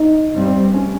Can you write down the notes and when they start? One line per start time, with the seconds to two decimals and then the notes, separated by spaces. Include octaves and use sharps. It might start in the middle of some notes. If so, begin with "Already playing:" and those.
Already playing: D#4
0.36 G2 G3 C4
0.74 C#4